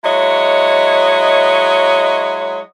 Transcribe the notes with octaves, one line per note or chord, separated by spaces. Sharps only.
F#3 G#3 E4 C#5 D#5